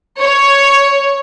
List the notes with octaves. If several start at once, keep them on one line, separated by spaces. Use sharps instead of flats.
C#5